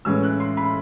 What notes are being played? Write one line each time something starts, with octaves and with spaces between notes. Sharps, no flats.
A2 E3 G#3 C#4 E6
F#6
C6
B5